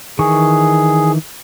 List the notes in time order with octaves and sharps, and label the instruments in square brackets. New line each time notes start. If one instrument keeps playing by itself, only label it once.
[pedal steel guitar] D#3 E3 C#6 [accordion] G#4